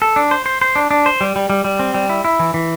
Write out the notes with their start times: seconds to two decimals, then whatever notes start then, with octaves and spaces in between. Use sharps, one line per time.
0.02 A4
0.16 D4
0.31 C5
0.46 C5
0.62 C5
0.76 D4
0.91 D4
1.06 C5
1.21 G3
1.36 G3
1.50 G3
1.65 G3
1.79 C4
1.94 G3
2.09 E4
2.25 E4
2.40 E3
2.54 E3